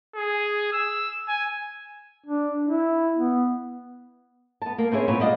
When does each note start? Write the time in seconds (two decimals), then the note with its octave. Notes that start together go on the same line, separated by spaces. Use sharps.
0.16 G#4
0.73 E6
1.28 G#5
2.26 D4
2.67 E4
3.17 B3
4.62 B3 A5
4.78 A#3
4.92 C4 C#4 E4 G#4 C#5
5.08 A#2 B3 C4 B4 C#5
5.20 G3 D4 D5 D#5 F5 F#5